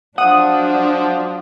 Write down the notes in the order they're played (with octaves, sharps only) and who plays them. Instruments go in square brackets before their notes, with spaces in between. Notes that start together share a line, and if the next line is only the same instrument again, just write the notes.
[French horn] F3 [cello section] F#3 D4 [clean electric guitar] F#5 [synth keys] D#6